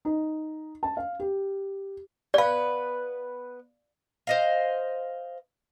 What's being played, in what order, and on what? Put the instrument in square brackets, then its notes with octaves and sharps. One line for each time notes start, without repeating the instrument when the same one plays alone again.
[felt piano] D#4
A5
F5
G4
[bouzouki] B3 B4 [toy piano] D5 F5
[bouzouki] C5 D#5 F5